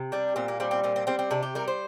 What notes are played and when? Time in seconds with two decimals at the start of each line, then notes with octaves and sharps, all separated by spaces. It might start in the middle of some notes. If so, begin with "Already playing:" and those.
Already playing: C3
0.12 G3 D4
0.36 A#2 C4
0.48 A#3
0.60 G3 C4
0.71 C4
0.84 A#2 C4
0.96 C4
1.07 G3 C4
1.19 C4
1.31 C3 D4
1.43 G4
1.55 G3 A#4
1.68 C5